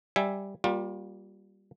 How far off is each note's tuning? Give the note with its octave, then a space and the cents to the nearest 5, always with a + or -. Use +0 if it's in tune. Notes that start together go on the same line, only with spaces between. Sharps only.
G3 +0 E5 +0 G#5 +0
G3 +0 A#3 +20 F4 +30